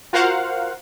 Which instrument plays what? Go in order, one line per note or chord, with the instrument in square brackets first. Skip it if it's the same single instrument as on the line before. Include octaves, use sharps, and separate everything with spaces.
[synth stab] F4 F#4 A#4 C5 F5 F#5